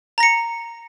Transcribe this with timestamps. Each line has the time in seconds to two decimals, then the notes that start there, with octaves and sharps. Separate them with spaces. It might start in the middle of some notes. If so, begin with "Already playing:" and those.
0.18 A#5
0.20 A#6
0.23 C#7